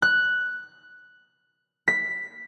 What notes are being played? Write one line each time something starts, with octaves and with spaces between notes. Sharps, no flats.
F#6
B6